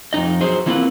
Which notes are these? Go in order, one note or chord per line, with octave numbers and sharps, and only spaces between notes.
F2 G#2 D#4 D#5
F#3 G#4 C5
E3 A#3 C4 E4 F4 B4